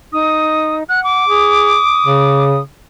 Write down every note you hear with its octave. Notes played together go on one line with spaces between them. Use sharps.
D#4 D#6
F#5 F#6
D6
G#4 D#6
C#3